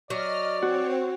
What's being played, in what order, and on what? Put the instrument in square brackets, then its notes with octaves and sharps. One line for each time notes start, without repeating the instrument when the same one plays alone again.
[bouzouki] F#3 [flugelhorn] D5 [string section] D#5 F6
[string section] C4 C#5 [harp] F#4